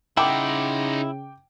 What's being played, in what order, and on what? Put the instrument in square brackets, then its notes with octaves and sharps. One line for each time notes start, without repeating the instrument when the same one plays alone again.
[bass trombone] C#3 [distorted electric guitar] D#4 F#5 [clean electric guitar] E4 [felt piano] G5 D6